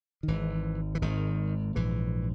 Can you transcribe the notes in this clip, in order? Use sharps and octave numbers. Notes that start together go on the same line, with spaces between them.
D#3
G#1 G#2 E3
E3
G#1 G#2 D#3
A#1 G#2 E3